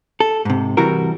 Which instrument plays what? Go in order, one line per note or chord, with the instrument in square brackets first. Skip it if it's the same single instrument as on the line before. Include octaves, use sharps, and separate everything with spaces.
[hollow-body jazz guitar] A4
G#2 C3
C3 E3 G3 E4 F#4 A#4